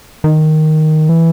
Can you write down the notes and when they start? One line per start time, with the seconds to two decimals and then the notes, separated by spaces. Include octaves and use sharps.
0.24 D#3
1.09 E3